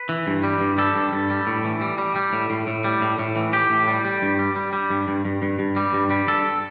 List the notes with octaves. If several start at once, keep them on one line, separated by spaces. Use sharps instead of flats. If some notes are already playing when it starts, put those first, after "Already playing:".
Already playing: B4
E3
G2
G3
G2
G3 A4
G2
G2
G3
A2
E3
G3
G3
G3
A2
A2
A2
G3
A2
A2
E3
A2 G4
A2
G3
G3
G2
G3
G3
G3
G2
G2
G2
G2
G2
G3
G2
G3
G2 A4